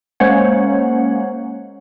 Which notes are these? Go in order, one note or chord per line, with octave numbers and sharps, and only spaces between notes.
G#3 A#3 C#4 C5 C#5 F#5